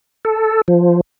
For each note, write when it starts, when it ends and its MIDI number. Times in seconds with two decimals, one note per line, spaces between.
0.25 0.61 69
0.68 1.01 53